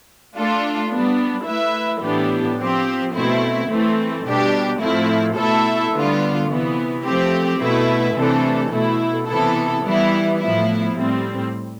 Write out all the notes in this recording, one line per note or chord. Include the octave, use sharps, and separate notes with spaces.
A3 D4 F4 A4
G3 B3 D4
A3 E4 B4 E5
A2 E3 B3 D4 G4
F3 C4 G4
B2 A3 C4 E4
E3 A3 C4
B2 G3 D4 G4
A2 F3 A3 C4 E4
B2 A3 E4 A4 E5
D3 G3 B3 F4
C3 E3 B3
F3 A3 C4 G4
B2 A3 E4 B4 E5
C3 E3 A3 D4 A4
B2 A3 E4
C3 E3 B3 E4 A4
E3 G3 B3 E4
A2 F3 B3 E4
A2 G3 C4